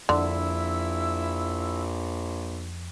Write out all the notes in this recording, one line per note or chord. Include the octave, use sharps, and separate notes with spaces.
A#1 F2 D3 E4 E6